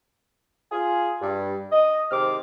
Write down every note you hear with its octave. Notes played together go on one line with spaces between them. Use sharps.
F4 G#4
G2
D#5
G#2 C3 D#3 C4 D6 F6